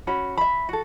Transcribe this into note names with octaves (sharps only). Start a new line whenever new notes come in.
C#4 F#4 B5
E5 B5
F#4 A4